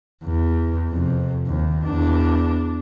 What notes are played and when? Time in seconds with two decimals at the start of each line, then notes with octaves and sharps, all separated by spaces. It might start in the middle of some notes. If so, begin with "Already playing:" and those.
0.24 E2
0.89 F2 C3
1.47 D#2
1.85 E2 D4